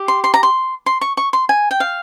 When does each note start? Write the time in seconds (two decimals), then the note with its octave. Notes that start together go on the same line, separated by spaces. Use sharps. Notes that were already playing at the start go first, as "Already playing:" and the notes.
Already playing: G4
0.08 C6
0.24 C6
0.34 A#5
0.43 C6
0.86 C6
1.01 C#6
1.17 C#6
1.33 C6
1.49 G#5
1.71 G5
1.80 F5